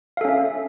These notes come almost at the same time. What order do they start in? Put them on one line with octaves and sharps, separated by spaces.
F5 A4 C#4 E5